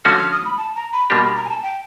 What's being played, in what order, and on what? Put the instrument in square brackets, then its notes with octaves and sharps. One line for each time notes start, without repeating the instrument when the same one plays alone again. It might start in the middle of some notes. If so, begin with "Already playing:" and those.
[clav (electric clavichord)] D3 F3 A3 C#4 F#4 [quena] F6
[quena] F6
D#6
B5
A5
A#5
B5
[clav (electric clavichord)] B2 G3 A#3 D4 G4 [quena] C6
[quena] B5
A#5
G#5
A5
G5